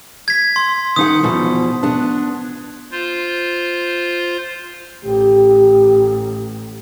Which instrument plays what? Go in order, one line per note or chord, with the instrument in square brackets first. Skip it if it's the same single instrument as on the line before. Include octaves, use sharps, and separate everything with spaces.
[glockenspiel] G#6 B6
C6
[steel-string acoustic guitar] D#3 D#4 F#5 [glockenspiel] D#6
[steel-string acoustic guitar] E2 B2 F3
B3 D4
[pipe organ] F4 C5
[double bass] A1 [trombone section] G4